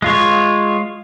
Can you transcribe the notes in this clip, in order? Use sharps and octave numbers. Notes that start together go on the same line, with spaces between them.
G#3 F4 C#5